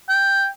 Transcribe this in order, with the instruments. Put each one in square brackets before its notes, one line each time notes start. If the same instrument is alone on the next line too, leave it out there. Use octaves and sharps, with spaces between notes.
[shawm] G5